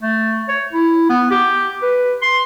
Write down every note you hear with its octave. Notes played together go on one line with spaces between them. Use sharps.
A3
C#5
E4
B3
G4
B4
C6